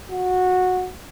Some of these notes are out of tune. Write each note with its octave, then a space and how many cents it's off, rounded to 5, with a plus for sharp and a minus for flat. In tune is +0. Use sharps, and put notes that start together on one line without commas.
F#4 -15